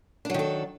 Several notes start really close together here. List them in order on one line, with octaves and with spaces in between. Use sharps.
D4 F#3 D#3 A4